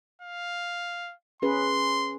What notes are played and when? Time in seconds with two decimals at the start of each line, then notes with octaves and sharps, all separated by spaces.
0.21 F5
1.42 C#4 G#4 B4 C6